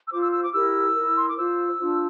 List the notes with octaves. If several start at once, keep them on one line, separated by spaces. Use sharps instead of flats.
E6
F4 C5 D6
E6
E6
D6
E4 G4 A#4 E6
E4 A#4
C6
D6
F4 C5 E6
D4 F4 C5